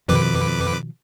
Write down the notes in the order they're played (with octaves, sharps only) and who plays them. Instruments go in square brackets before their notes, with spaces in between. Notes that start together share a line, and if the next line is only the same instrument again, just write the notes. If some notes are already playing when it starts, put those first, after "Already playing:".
[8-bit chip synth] F2 B4 D6 [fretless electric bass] B2 D#3 F3